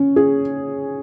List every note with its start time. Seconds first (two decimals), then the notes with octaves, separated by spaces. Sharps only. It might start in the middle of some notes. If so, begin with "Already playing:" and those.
Already playing: C#4
0.16 G#4